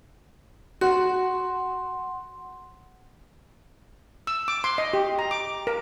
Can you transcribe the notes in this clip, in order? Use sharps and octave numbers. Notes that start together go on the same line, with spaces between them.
F#4 F#5 C6
E6
D6
C6
D#5
G4
A#5
D6
A#4